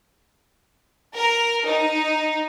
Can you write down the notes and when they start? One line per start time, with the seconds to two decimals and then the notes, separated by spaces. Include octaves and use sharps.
1.15 A#4
1.66 D#4